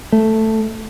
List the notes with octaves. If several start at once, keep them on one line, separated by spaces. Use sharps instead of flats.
A3